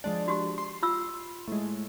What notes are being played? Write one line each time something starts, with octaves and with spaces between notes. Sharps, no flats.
F3 G#3 D4
F#4 G4
C6
F4 E6
A2 G#3